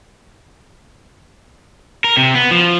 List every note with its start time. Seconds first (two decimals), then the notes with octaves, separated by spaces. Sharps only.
2.04 A#4
2.17 C3
2.35 B3
2.51 F3